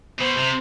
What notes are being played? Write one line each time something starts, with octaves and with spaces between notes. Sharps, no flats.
B2 C5
C3